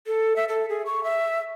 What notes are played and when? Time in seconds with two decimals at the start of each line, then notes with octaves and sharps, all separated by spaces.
0.07 A4
0.36 E5
0.49 A4
0.69 G#4
0.86 C#6
1.04 E5